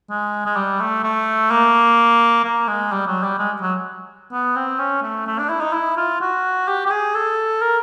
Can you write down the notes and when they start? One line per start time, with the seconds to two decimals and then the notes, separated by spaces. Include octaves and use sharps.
0.10 G#3
0.46 G#3
0.56 G3
0.80 A3
1.04 A3
1.51 A#3
2.44 A#3
2.68 G#3
2.92 G3
3.07 F#3
3.23 G3
3.39 G#3
3.61 F#3
4.32 B3
4.56 C4
4.79 C#4
5.02 A3
5.27 A3
5.39 D4
5.49 E4
5.61 D#4
5.73 E4
5.97 F4
6.21 F#4
6.68 G4
6.86 G4
6.90 G#4
7.14 A4
7.61 A#4